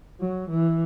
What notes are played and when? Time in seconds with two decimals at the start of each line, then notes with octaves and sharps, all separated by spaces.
0.20 F#3
0.50 E3